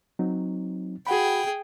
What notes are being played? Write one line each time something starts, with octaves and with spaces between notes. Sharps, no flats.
F#3 C4 D#4
F#4 G#4 F#5 G5 B5